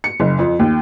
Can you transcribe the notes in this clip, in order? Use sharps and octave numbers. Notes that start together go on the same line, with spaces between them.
C#7
F#1
F2
D#2